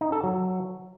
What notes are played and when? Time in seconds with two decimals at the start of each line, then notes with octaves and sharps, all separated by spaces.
0.01 D#4
0.12 A4
0.24 F#3